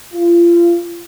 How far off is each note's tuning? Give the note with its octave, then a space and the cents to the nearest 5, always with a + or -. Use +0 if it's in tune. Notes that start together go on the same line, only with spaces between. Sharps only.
F4 -30